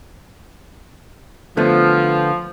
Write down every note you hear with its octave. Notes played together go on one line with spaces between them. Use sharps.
D3 F3 A3 B3